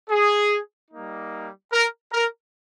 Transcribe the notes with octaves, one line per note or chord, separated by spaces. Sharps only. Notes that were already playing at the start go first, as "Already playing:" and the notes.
G#4
G3 A#3 D#4
A#4
A#4